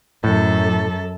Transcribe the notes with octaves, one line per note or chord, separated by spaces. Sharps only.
F#2 A2 A4